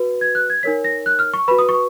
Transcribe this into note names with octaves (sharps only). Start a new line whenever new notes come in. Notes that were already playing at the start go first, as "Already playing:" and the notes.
Already playing: F#4 B4
G#6
F#6
G#6
D#4 A#4 C#5 B6
A#6
F#6
F6
C#6
F#4 B4 B5
D#6
C#6